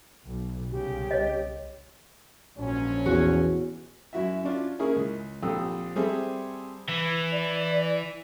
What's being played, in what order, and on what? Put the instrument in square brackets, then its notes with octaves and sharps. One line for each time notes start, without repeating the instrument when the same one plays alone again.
[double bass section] B1
[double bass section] C2 C#3 [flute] G4
[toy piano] C#5 D#5
[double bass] A#1 G#2 [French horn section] F3 F#3 C#4
[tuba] E2 [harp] F#4
[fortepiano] F#2 E4 F#4 E5
C#4 D4 F4
A#3 C#4 E4 G#4 A#4
C#2
A#1 C4 G4 A4 D#6 E6
G3 C4 G#4 A4 C5 E5
[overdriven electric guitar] E3
[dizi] D5